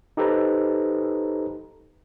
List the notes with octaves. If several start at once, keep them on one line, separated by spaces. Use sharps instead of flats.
D#4 G4 A4 B4 C5 A#5